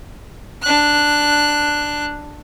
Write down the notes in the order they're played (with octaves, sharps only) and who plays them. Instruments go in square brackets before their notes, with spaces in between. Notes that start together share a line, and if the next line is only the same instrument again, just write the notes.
[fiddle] D4 F#6